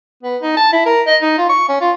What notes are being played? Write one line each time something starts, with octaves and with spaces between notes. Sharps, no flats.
B3
D#4
A5
E4
A#4
D#5
D#4
F4
C#6
C#4
F4